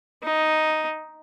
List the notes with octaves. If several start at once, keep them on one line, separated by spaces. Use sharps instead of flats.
D#4